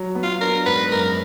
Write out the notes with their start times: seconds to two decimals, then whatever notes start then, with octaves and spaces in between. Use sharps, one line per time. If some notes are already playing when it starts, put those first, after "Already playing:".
Already playing: F#3
0.15 B3
0.23 F4
0.41 D4 A#4
0.66 G#2 B4
0.92 F#2 A#4